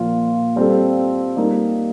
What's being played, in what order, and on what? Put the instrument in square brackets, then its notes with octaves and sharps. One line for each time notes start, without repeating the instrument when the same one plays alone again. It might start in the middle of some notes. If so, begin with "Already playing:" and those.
Already playing: [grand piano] A#2 F3 A#3 F4
G3 C4 F4 A4
G3 A#3 D#4